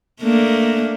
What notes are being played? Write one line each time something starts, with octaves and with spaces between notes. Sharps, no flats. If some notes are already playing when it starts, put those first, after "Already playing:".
A3 A#3 D4